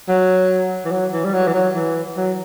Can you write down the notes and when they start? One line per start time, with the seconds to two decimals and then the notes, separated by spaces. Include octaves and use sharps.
0.08 F#3
0.85 E3
0.92 F#3
1.13 E3
1.25 G3
1.34 F#3
1.47 E3
1.54 F#3
1.75 E3
2.17 F#3